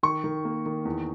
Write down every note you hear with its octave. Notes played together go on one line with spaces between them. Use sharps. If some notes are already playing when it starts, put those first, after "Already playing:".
D#3 C#6
D#3
A#3
D#3
E2